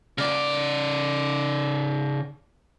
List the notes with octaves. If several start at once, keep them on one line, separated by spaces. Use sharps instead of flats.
C#3 D5